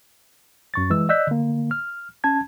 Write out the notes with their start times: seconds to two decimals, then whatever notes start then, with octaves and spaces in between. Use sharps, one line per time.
0.74 F#2 C#6 A6
0.90 E3 G#3 E6
1.09 D5 D#5 E6 F#6 G6 B6
1.27 D3 A#3
1.71 F6
2.24 C#4 A5 G#6